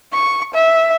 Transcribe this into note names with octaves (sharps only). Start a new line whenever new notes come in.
C#6
E5